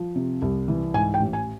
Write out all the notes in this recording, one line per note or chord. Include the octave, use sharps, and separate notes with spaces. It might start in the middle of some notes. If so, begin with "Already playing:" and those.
Already playing: F3
C3
C2
E3
G#2 G#5
G5
A1
G#5